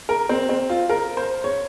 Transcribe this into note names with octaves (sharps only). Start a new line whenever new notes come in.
A#4
C4
C4
F4
A#4
C5
C#5